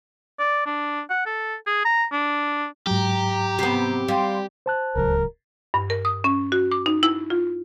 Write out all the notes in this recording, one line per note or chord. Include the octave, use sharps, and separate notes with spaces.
D5
D4
F#5
A4
G#4
A#5
D4
G#2 F#3 G4 A#5
C3 B3
G3 F5 G5 C6
C5 A5 F#6
D1 C#2 F#3 A#4
G2
A#4
D#6
C#4
F#4
D6
D#4
E4
F4